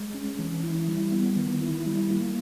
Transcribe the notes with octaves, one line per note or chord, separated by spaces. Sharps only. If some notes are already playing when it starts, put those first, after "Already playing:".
Already playing: G#3
C#4
E3
E4
G3
B3
D#3
E4
G3
A#3